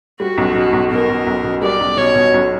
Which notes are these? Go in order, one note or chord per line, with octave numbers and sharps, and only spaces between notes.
G3 F#4
B1
B2
B1
B2 A#4
B2
B1
B2
G3 D5
B1
B2 C#5
B2
B1